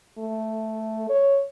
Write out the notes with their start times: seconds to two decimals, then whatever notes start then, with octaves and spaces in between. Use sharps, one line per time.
0.18 A3
1.09 C#5